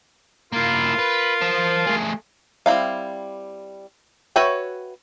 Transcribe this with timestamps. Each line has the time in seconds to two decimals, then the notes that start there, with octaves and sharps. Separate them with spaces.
0.52 A#3 E4 F4 A#4 F5
0.99 B4
1.42 C5 A5
1.87 A3 G#4
2.66 G3 C4 D#4 E4 F5
4.36 F#4 B4 C#5 E5 G5